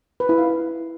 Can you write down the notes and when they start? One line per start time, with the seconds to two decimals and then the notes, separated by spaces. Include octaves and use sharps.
0.20 B4
0.29 E4
0.38 F5